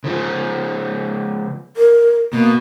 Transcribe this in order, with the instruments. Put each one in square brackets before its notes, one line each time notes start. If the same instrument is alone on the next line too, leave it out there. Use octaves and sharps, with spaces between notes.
[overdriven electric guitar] C#3 F3
[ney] A#4
[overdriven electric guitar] B2 [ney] A#3